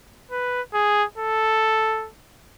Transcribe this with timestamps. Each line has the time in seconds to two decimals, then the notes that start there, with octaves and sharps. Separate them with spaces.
0.32 B4
0.74 G#4
1.18 A4